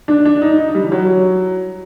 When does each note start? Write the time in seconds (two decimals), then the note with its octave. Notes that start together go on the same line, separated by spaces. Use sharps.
0.08 D4
0.25 D4
0.42 D#4
0.58 D#4
0.74 G3
0.83 E3
0.92 F#3